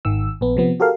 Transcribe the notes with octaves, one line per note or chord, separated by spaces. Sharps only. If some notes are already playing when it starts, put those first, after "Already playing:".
G#1 D#3 E6
A#1 B3
C3 F3 B3
F#4 G4 A4 A#4 F5